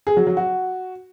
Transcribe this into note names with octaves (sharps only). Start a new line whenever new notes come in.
G#4
F#3
F#3
F#4